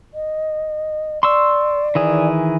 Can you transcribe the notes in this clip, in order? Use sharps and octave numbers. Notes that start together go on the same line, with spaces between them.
D#5
D5 C6 C#6 E6
D#3 E3 G#4